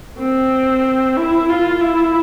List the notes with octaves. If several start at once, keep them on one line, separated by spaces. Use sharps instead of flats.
C4
E4
F4
E4